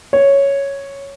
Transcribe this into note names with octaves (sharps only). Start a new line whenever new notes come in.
C#5